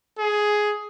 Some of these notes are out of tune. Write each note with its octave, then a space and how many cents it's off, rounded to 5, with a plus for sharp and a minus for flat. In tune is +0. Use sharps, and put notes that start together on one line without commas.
G#4 +10